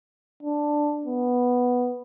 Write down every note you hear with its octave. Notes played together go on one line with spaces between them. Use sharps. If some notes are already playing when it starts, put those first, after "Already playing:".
D4
B3